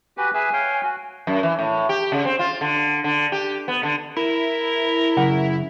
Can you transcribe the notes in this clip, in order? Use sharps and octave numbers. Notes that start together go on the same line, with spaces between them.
F#4 G4 B4 G#5
G#4 B4 E5 G#5
C#5 F5 G5
F#4
F#2
E3
A2
G4
C#3
C4
F4
D3
D3
G4
B3
D3
E4 A#4
F#2 C#3 F#5